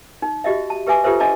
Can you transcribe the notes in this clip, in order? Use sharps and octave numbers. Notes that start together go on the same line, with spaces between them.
D#4
F#4 G4 D#5 E5
A5
G4 B4 E5 G#5 D6
F4 G4 A4 B4 C5 E5
D4 D#5 E5 A5 D6